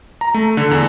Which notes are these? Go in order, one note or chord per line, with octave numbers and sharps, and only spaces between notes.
A#5
A3
D3
E2